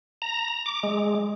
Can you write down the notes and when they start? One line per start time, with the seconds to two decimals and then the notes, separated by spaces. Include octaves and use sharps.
0.22 A#5
0.66 D6
0.83 G#3